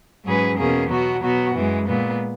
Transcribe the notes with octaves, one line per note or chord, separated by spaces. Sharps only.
G#2 F#3 C#4 G#4 B4
E2 B2 A#3 C#4 G#4
B2 F#3 B3 F#4
B2 F#3 B3 F#4
F#2 E3 G#3
A#2 G#3 B3